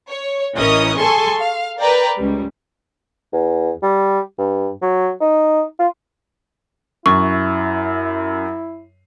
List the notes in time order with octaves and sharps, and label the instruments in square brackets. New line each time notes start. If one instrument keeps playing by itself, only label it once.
[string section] C#5
A1 E3 C#4 A#4 D#5 D#6
G#4 A4 G#5 A5 C6 C#6
F5
A#4 B4 D5 G5 A#5
C#2 G3
[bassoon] E2
G3
G2
F#3
D#4
F4
[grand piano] F#2 [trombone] E4 [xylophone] C#6